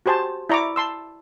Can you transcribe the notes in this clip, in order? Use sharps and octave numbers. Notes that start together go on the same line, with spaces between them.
F#4 G4 C5 G#5 A5
E4 D5 A#5 C#6 D6
A5 C6 E6